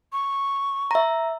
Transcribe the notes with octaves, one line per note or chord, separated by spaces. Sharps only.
C#6
E5 A#5